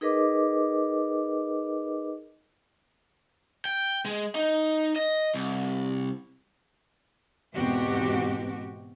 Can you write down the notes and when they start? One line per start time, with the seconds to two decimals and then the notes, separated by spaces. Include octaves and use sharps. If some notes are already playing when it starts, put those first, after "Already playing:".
0.01 D#4 G#4 A#4 B4 D#5 D6
3.65 G5
4.06 G#3
4.35 D#4
4.96 D#5
5.34 C2
7.54 E2 G#2 B2 C4 F#4 G4